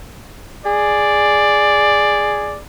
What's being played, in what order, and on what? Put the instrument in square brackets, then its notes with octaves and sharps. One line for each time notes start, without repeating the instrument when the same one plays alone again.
[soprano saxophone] G#4 [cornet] D5